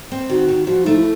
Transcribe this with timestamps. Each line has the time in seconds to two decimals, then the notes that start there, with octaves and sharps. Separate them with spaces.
0.12 C4
0.29 D#3 F#4
0.48 D#3
0.67 F3 F#4
0.84 A3 D#4
0.95 E4